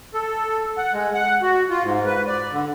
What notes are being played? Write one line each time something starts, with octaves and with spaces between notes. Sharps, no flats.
A4
F#5
G#3
F#5
F#4
F4
G#2
B4
D5
D3